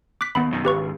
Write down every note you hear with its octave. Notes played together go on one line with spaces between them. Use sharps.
D6 F#6 B6
D#2 B3 B5
F#2 B2 D#3
G#1 C#2 G4 B4 C#6